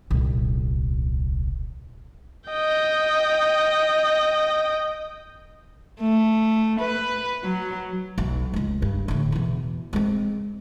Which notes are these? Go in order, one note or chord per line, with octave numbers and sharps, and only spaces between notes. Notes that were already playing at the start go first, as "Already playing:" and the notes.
D#1 C2
D#5 G5
A3
B4
F#3
B1 F#3
C#2 G#3
G2
A2 D3
E2 B2
G#3 C4